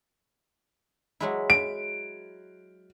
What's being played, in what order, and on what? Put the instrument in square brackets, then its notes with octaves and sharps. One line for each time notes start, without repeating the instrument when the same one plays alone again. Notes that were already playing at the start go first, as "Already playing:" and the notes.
[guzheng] F#3 G#3 E4
[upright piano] D7